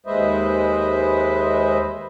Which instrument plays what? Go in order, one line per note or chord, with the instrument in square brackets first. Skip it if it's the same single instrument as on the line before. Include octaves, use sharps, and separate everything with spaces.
[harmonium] D#2 G#3 B4 C5 D#5 E5